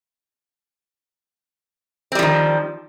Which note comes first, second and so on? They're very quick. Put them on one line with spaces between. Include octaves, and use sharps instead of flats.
C4 G3 F3 D#3